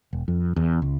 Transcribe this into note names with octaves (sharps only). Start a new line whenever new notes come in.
E1
F2
E2
C#2